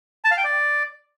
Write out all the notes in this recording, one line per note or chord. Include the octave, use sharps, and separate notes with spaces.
A5
F5
G5
D5